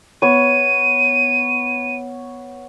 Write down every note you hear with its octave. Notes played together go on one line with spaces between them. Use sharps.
B3 C#5 D#7